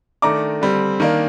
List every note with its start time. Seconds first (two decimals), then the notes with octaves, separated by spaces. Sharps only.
0.22 D#3 A3 D4 A#5 D6
0.62 D3 G3 C4
1.00 D#3 A#3 D4